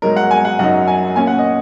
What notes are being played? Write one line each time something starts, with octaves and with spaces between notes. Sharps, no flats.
G#2 F#3 D#4 A#4
F#5
G#5
F#5
F#2 F#3 D#4 F#5
G#5
A#2 A#3 C#4 G#5
F#5
D#5